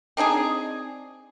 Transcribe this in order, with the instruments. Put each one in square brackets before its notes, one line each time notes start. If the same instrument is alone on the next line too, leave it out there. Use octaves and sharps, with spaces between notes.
[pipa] C4 D4 D#4 G#4